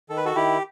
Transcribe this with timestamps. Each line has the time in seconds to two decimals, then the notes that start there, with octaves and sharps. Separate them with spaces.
0.09 D#3 A4
0.17 B4
0.25 F#4 A4
0.36 D#3 E4 G4